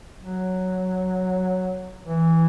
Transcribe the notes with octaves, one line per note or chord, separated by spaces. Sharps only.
F#3
E3